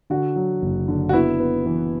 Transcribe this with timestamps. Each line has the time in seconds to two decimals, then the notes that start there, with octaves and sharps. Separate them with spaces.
0.10 D3 F#4
0.36 F#3
0.62 F#1
0.88 D3
1.09 F#4
1.13 B3 E4
1.40 B3
1.66 E3